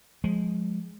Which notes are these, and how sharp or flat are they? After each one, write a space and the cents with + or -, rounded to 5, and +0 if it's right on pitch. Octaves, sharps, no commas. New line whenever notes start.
F3 +30 G#3 +5